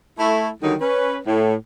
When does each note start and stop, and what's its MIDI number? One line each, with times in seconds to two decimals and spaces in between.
0.19 0.49 57
0.19 0.49 64
0.62 0.74 50
0.62 0.74 51
0.62 0.74 54
0.62 0.74 55
0.62 0.74 63
0.81 1.18 61
0.81 1.18 71
1.27 1.54 45